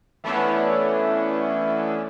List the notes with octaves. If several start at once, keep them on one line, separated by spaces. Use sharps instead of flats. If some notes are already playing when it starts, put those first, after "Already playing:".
E3 A3 B3 C#4 D4 E4